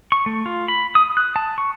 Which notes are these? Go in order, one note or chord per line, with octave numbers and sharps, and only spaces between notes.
C#6
A3
F4
B5
D#6
F#6
A5
C#6